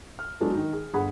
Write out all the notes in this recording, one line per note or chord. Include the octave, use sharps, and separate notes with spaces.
F6
F#3 G#3 B3 D4 F#4 A4
D#3 D#4
G#4
G1 G#4 F#5 B5